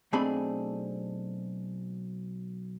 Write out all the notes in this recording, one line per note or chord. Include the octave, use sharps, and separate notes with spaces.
B1 A3 C4 D4 G#4 B5